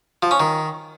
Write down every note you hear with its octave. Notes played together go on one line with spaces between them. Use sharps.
F3
C#4
D#3